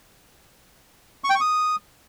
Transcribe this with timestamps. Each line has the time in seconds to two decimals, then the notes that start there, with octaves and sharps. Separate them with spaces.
1.24 C#6
1.30 G5
1.35 C#6
1.41 D#6